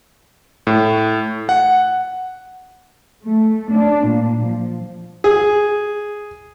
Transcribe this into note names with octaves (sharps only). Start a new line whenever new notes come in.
A2
F#5
A3
D4
A#2
F3
G#4